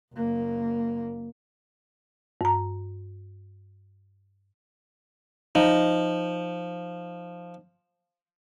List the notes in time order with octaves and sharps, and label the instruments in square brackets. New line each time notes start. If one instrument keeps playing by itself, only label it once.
[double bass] F#1 A#3
[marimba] G2 A#5
[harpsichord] F3 [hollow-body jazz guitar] D#4